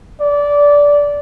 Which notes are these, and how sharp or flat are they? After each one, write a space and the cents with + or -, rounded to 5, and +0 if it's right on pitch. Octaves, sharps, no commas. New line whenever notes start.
D5 -15